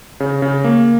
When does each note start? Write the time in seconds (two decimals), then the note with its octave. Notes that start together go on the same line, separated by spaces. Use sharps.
0.20 C#3
0.42 C#3
0.64 A#3